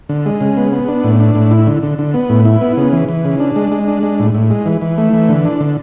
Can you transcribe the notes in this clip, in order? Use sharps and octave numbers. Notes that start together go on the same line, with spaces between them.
D3
G#3
C#3
B3
B3
D4
A2
D4
A2
E4
D3
D3
D3
B3
A2
E4
B3
C#3
E3
E3
C#3
D4
G#3
G#3
D4
G#3
A2
A2
G#3
E3
E3
A3
E3
D3
D4
D3